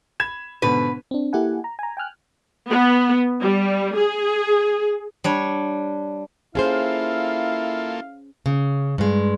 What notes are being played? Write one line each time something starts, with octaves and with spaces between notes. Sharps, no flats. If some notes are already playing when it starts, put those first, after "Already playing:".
B5 G#6 E7
G#2 B2 D3 B4
C4 D4
A#3 E4 G4 A4 F#5 G#5
A#5
G#5 A#5
G5 G#5 F6 F#6
B3
G3
G#4
G3 D4 C#5
A#3 C#4 E4 F4 G#4 A4 C5 F5
C#3
G2 G#3